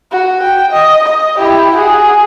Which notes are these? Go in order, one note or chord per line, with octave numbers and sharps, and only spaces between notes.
F#4
G5
D#5
D#5
E4 G4
F#4 G#4